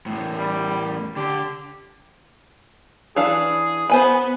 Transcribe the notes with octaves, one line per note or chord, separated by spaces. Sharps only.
E2 A2
G3
D3 G4
E3 D4 G#4 F5
B3 C5 G#5 B5